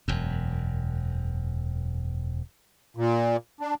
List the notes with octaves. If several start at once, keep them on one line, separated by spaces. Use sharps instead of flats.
E1 F#2
A#2
D4